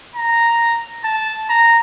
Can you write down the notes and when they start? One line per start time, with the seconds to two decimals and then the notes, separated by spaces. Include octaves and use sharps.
0.16 A#5
1.04 A5
1.49 A#5